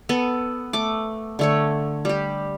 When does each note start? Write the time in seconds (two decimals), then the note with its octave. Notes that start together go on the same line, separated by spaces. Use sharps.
0.09 B3 A4
0.73 A3 D6
1.39 D3 A3 C#5
2.05 G3 G4